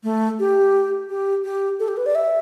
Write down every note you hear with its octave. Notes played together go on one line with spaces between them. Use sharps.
A3
G4
G4
G4
A4
G4
B4
D5
E5